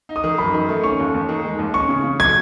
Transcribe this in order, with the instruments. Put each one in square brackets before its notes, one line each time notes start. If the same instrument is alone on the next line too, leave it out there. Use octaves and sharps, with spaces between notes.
[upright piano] D#4
[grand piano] D#6
[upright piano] D#3
[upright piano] F#2 [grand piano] B5
[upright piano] D#3
A3
[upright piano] C#4 [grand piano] C#6
[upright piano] D#2
D#2
D#3
G#3
D#2
[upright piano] C#4 [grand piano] C#6
[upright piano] C#3
C#3
[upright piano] F#3 [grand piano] G#6